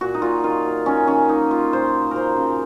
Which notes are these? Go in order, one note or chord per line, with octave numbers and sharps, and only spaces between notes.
A#2 F#4
D#4
A#2 F4
D#3 F4
F#3
D#3 C#4
D#3 C#4
A#3 D#4
A#3 F4
A#2 C5
F#3
C#3 A#4 C5
C#3